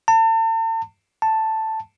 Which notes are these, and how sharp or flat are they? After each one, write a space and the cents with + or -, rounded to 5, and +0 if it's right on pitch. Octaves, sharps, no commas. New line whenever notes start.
A5 +40
A5 +5